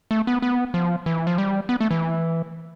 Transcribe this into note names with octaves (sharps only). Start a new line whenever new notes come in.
A3
B3
B3
F3
E3
F3
G3
B3
A3
E3